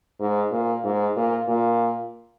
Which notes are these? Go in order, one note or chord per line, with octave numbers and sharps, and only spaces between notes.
G#2
A#2
G#2
A#2
A#2